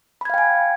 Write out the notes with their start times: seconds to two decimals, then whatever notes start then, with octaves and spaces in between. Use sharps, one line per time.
0.21 B5
0.25 G#6
0.30 F5
0.34 G5
0.38 G#5